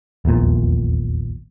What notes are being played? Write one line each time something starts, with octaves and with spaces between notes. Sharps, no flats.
D#1 A#1 E2 A#2